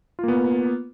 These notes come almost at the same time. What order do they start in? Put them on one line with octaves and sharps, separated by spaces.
F4 A#3 B3